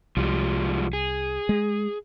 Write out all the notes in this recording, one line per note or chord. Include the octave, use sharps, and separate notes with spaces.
C2 F3 G3 G#3
G#4
G#3